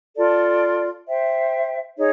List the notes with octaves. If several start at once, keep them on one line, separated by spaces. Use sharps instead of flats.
F4 A4 D5
C5 E5 G5
D#4 G#4 C#5